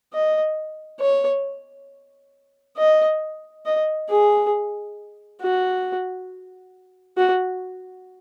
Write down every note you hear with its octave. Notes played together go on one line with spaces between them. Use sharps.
D#5
C#5
D#5
D#5
G#4
F#4
F#4